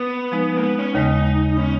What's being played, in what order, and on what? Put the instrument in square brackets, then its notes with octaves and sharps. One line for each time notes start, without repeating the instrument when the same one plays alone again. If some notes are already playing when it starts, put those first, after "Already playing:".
Already playing: [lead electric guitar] B3
[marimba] F3 G#3 D#4
[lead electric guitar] A#3
B3
C#4
[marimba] D#2 C#3 G#3 [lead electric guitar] D#4
[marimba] A#2 G#3 B3 [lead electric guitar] C#4